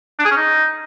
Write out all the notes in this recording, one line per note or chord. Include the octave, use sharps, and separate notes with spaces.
D4
G#4
C#4
D#4